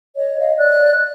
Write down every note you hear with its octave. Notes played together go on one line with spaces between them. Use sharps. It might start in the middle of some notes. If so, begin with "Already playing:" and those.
C#5 D#5
D#5 F5
D5 F#6